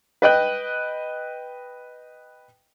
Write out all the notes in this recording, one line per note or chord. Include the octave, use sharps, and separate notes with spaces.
B4 D#5 G5 F#6